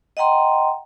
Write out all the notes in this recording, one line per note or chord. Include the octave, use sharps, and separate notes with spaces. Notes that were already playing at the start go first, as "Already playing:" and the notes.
D#5 F#5 G5 A#5 C6